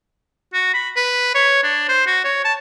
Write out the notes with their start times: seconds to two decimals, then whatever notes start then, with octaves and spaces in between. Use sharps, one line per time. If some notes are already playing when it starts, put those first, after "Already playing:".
0.54 F#4
0.74 B5
0.97 B4
1.35 C#5
1.63 D4
1.89 C5
2.07 F#4
2.25 C#5
2.45 A5